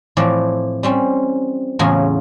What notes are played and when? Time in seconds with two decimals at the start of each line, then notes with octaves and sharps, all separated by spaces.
0.17 A2 E3 F3 C4 D5
0.83 G3 C4 C#4
1.79 E2 A2 C#3 F#3 F4 G#5